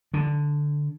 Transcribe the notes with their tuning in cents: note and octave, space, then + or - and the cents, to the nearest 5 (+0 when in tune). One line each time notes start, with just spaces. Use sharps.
D3 +0